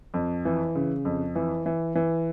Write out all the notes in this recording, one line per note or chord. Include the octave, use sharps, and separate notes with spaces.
F2
E3
C#3
F2
E3
E3
E3